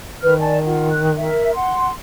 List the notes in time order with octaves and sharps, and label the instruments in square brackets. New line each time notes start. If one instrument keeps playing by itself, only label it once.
[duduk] D#3 [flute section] B4 F6
[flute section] D5 G#5 A5
F4 F#5
F#6
A#4 E5
F#5 C6